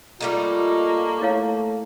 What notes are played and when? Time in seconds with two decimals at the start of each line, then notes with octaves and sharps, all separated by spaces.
0.21 G3 A3 A#3 D#4 F4
1.22 A3 E4 C#5 F5